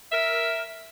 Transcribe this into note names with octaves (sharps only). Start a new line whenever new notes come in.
A#4 E5